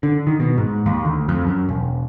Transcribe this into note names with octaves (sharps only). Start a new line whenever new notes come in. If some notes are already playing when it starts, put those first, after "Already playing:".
D3
D#3
B2
G#2
D#2
D2
F2
F#2
E1